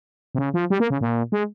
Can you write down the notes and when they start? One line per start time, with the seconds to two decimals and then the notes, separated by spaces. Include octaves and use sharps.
0.35 C3
0.38 C#3
0.54 F3
0.70 G3
0.80 A#3
0.90 C#3
1.01 A#2
1.32 G#3